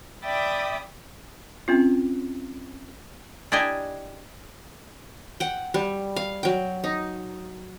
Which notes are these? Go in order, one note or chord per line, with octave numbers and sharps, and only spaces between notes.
D5 E5 G5 B5 D6 D#6
C4 C#4 F4
D4 E4 G4 D#5 G#5
F#5 G5
G3
F5
F#3 G5
D#4